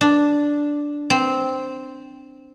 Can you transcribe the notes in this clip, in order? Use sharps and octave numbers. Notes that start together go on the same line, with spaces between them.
D4
C4